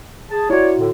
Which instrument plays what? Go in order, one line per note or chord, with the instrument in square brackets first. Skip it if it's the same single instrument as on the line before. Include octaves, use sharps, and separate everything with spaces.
[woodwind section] G#4 A5
[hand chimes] E4 F#4 [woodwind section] C#5 D5
[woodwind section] A2 D3